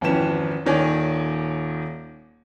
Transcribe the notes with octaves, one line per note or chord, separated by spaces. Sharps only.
G#1 F2 E3 B3 C#4 E7
D#1 D#3 C#5 D5 G#5